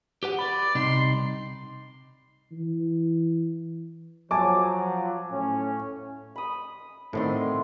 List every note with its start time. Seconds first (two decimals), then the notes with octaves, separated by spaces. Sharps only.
0.23 G4 B4 F#5
0.39 D5 B5
0.75 C2 C3 D#4 C6
2.52 E3
4.31 F3 F#3 G#5 A5 D6
5.31 A2 C#4
6.36 B5 D#6
7.13 A2 D#3 A3 B3 C4 D5 C6